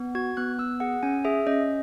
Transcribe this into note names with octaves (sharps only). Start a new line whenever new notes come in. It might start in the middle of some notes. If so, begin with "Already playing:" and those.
Already playing: B3
F#4 G#6
B3 F#6
B3 E6
G#4 F#5
C#4 G#5
G#4 E5
C#4 D#5